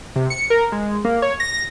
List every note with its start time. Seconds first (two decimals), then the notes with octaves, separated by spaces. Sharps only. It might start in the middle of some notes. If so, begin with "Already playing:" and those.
0.16 C3
0.30 C#7
0.50 A#4
0.72 G#3
1.05 A#3
1.22 C#5
1.40 A#6